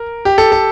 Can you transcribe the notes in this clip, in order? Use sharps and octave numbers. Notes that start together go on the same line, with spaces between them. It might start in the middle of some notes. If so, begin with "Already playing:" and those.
Already playing: A#4
G4
A4
A4